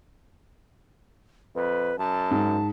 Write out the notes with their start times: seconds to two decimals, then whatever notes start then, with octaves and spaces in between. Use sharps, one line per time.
1.55 F2 B4
1.99 F#2 A5
2.31 G#2